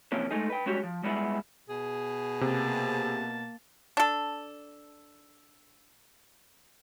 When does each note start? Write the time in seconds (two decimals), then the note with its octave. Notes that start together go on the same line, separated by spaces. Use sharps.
0.12 C3 E3 F3 A#3 C#4
0.31 G#3 A3 D#4 G#4
0.50 B4 G5
0.66 G3 G#3 C#4 F#4 G4
0.84 F3
1.03 G3 G#3 B3 E4 F4 G#4
1.69 B2 G#4
2.41 C3 A#3 A5
3.97 D4 A4